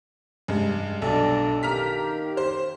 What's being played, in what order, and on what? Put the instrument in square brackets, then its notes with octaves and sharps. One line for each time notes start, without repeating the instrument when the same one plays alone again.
[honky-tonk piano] G2 G#3
[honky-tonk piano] B1 [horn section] D4 A4
[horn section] D#3 A#3 G4 [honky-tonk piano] A#5 F6 B6
[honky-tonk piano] C5